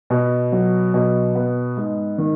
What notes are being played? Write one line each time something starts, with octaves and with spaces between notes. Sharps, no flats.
B2
F#3
B2
B3
G#2
D#3